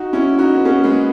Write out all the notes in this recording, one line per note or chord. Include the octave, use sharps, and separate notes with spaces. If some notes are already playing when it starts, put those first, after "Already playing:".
Already playing: D#4 F#4
C#4 E4
D#4 F#4
B3
A#3 C#4
G#3 B3